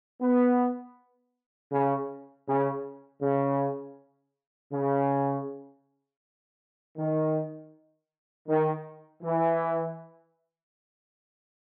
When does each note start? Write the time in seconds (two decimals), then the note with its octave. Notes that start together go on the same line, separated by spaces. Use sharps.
0.21 B3
1.71 C#3
2.46 C#3
3.21 C#3
4.72 C#3
6.96 D#3
8.47 D#3
9.21 E3